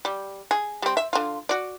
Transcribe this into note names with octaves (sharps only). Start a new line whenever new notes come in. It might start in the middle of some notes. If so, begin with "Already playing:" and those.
G3
G#4
G3 C4
E5
D3 F4
F#4 D5